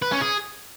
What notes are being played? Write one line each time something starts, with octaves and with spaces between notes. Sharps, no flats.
B4
C#4
G#4